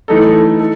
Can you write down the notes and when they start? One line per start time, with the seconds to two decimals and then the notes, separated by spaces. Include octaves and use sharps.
0.08 E3 A3 D#4 A4
0.60 A4